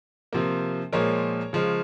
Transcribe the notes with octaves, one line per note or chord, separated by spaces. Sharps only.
C3 F3 A#3
A#2 F3 G#3 A#4 C#5
C#3 F3 G#3